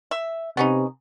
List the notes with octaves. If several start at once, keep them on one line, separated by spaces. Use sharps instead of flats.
E5
C3 B3 C#4 D#4